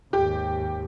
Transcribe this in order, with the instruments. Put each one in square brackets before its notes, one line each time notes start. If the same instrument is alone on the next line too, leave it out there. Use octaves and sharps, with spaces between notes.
[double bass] D#2 G#2 [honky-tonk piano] G4